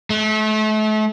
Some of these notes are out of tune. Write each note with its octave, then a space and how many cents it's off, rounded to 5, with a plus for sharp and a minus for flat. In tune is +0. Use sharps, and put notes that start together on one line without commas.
A3 -35